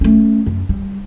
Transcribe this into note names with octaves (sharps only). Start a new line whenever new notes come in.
A3 C#4
F#2
G3